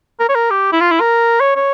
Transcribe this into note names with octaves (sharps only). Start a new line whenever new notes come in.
A#4
C#5
A#4
G4
E4
F4
E4
A#4
C#5
C#5